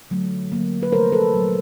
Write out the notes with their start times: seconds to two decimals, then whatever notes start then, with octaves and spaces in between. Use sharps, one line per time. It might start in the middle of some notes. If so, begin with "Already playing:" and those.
0.10 D3 F#3 A3
0.52 D3 F#3 A#3
0.83 B4
0.92 C3 F3 A3 A#4 C5
1.12 A4 B4
1.33 A#2 F#3 A3